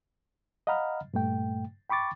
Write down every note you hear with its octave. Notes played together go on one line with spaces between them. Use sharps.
D#5 F5 F#5 A#5 B5 F6
G2 A#2 A3 G5
G5 B5 C#6 D6 A6